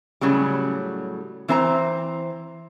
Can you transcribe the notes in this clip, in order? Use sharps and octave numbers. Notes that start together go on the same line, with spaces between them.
A2 C#3 F#3 G3
E3 C4 C5 A5 A#5